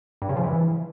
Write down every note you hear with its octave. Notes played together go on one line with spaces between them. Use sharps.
G2
C#3
F3
E3